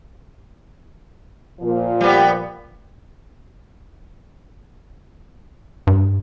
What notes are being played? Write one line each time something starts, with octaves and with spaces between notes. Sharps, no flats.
A#2 F3
G3 B3
G2